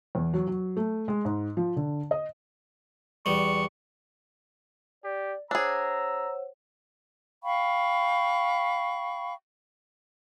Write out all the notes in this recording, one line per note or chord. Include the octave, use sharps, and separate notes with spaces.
E2
F#3
F#3
A3
G#3
G#2
F3
D3
D#5
E2 G3 C#6
G4 D5
D4 G#4 C5 C#5 F#5 A#5 E6
F5 G5 B5 C#6